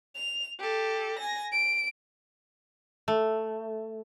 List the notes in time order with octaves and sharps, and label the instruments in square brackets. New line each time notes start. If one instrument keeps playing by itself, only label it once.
[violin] F7
G4 A4
G#5 A#6
D7
[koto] A3